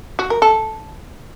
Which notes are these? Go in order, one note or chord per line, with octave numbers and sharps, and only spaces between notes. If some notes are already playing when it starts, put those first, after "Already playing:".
F#4
A#4
A4